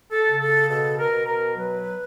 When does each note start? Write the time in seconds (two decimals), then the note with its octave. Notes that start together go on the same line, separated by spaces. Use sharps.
0.12 A4
0.26 C#3
0.41 A4
0.69 B2 A4
0.98 A#4
1.13 B2
1.27 A#4
1.56 F#3 B4